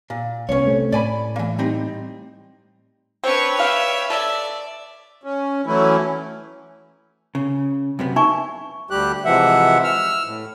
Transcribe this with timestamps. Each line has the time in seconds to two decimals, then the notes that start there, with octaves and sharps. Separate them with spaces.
0.10 A#2
0.49 C2 B3 C#4 C#5
0.65 C3 A3 C4
0.92 A2 D5 G#5 B5
1.36 E3 A#3
1.59 G3 C4 D#4
3.24 C4 D4 B4 C#5 C#6
3.59 G3 E5 F5 G5
4.10 A4 D5 E5
5.23 C#4
5.66 E3 F#3 A3 C#4 E4
7.35 C#3
7.99 F#2 C3 B3
8.16 D#4 E5 G#5 C#6
8.90 D2 G3 G4 F#6
9.25 C3 E3 F3 G#3 E5 F#5
9.84 E6 F6
10.26 A2